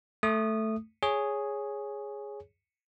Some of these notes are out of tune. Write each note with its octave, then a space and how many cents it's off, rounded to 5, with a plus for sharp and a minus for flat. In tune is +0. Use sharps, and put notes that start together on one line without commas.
A3 +0 D#6 -20
G#4 +0 C#5 +0